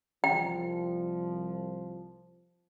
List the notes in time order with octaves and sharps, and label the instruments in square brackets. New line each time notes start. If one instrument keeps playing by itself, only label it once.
[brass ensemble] C2 F3 [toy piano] G5